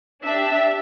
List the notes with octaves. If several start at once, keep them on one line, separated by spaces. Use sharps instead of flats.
D4 G4 E5